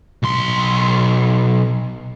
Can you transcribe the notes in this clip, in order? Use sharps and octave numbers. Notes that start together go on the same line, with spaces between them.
B1 C6